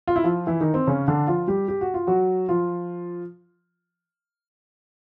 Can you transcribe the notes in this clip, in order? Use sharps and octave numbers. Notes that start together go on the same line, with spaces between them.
F4
E4
F3 F4
E3 E4
D#3 D#4
C4
C#3 C#4
D3 D4
F3 F4
G3 G4
G4
F#4
F4
F#3 F#4
F3 F4